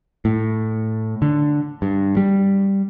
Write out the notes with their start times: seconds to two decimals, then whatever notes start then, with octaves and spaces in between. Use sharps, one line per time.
0.25 A2
1.22 D3
1.82 G2
2.17 G3